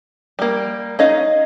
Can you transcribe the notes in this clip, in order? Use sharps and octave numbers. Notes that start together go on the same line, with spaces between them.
G3 A#3
C#4 D#4 D#5 F5